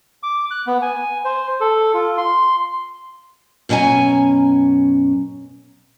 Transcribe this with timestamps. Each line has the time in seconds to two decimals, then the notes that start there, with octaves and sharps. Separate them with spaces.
0.23 D6
0.51 F#6
0.67 B3
0.82 G#5
1.25 C5
1.61 A4
1.94 F4
2.17 C6
3.69 F#2 B2 C#4 D5 G#5 A#5